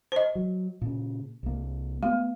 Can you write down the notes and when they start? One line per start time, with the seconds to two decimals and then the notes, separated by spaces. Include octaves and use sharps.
0.12 C5 D#5
0.35 F#3
0.82 A#2 C#3
1.43 C2 A#3
2.03 A3 B3